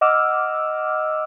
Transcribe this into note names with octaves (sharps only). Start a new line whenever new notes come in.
D#5 F#5 D6 E6 F6